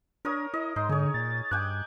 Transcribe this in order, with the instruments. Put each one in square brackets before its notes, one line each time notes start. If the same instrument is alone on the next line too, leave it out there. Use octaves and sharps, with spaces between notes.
[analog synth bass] D4 [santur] A#4 C#5 D#6
[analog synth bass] E4 [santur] D#5
[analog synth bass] G#2 [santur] D#4 [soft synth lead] C6
[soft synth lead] D3 [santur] G#4 C#5
[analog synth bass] A#2 [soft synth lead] A6
[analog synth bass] G2 [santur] G5 G#5 D6 [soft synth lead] F#6